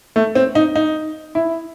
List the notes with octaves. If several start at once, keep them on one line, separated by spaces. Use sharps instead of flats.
A3
C4
D#4
D#4
E4